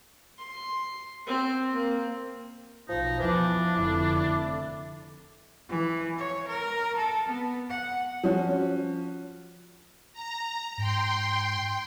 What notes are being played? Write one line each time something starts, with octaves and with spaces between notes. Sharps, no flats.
C6
C4
A#3 C4
B1 F3 D#4
E2 E3 F3 D4
F1 D3 E4
E3
C#5
A#4
A4
B3
F#5
F3 C#4 F#4
A#5
G#2 G5 C6